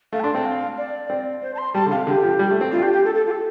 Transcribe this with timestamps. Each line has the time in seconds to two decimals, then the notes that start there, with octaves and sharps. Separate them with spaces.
0.13 A3 F5
0.20 A5
0.23 D4 C6
0.35 C4 A5
0.45 F5
0.78 D5
1.10 C4
1.42 C5
1.55 A5
1.58 C6
1.74 G3 A5
1.86 D3
1.91 C3 F5
2.07 D3 G4
2.23 F3
2.39 G3
2.51 A3
2.61 C4
2.71 D4 F4
2.82 G4
2.93 G4
3.04 A4
3.15 A4
3.26 F4
3.31 A4